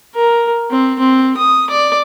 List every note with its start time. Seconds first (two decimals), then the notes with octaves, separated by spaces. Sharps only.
0.15 A#4
0.71 C4
0.99 C4
1.37 D#6
1.70 D5